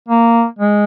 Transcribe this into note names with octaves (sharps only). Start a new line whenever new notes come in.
A#3
G#3